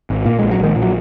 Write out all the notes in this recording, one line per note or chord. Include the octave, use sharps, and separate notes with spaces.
G#1
A#2 A#3
A#1 G#3
F#3
A#1 D#3 G#3
A#2
F#3